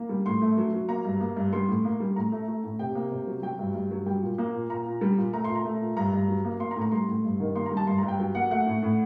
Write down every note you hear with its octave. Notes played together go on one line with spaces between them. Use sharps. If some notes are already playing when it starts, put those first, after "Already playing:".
Already playing: A#3
G3
A2 C6
A3
F#3
F#3
A#3 A#5
G2
A#3
G2
G3 C6
A2
A#3
G3
A2 A#5
A3
A3
A2
C3 G5
A#3
C3
F#3
F#3 G5
G2
G2
F#3
G3 G5
A#2
A#3
A#2
A#2 A#5
A#2
G3
A#2
A3 A#5
A#2 C6
A#5
A3
A#2
G2 A#5
G2
F#3
A#3
A#3 C6
A#5
A2
A#5
G3 C6
A2
G2
D#3
A#3 C6
A#5
G3
A5
G2 C6
A#5
G2
G5
F#3 G5
A#3 F#5
A3 F#5
A2
A2